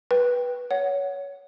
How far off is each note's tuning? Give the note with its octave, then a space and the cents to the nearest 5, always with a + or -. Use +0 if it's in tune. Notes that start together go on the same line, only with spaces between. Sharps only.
B4 -10 G5 +0
C#5 +20 F#5 +0